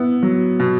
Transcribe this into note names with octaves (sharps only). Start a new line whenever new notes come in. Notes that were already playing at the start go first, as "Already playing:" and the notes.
Already playing: B3 E4
F#3
B2